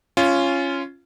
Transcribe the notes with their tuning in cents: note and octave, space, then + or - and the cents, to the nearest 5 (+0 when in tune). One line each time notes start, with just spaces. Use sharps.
C#4 +0 F4 -15